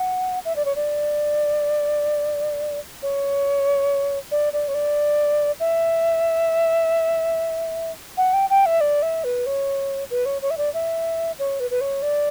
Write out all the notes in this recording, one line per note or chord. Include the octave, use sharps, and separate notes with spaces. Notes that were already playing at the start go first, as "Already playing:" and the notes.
Already playing: F#5
E5
D5
C#5
D5
C#5
D5
D5
C#5
D5
E5
F#5
G5
G5
E5
D5
E5
B4
C#5
B4
C#5
C#5
E5
D5
E5
C#5
B4
B4
C#5
D5